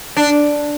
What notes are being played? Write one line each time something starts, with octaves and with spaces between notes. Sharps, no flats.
D4